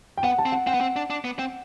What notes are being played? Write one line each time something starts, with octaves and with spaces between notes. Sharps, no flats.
G5
B3 F#5
A5
C4
F#5
C4 F#5
B3
C4
D4
D4
B3
C4